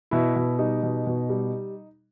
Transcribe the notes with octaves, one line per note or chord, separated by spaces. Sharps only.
B2 E4
B2
G3 D#4
B2
B2
G3